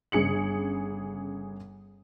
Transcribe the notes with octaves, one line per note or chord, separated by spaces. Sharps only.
G1 C#3 G#4 C#7 F#7